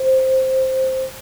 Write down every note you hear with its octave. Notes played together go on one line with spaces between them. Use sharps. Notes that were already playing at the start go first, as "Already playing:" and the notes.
Already playing: C5